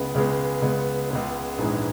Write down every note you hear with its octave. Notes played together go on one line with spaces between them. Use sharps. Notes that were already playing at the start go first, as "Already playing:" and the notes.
Already playing: C#2 C#3 G#3 B3
C#2 C#3 G#3 B3
C#2 C#3 G#3 B3
C#2 C#3 G#3 B3
A#1 G#2 E3 G#3